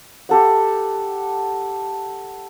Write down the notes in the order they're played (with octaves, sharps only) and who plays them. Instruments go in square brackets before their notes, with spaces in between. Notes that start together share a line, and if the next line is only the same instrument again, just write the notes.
[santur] G4 A4 F#5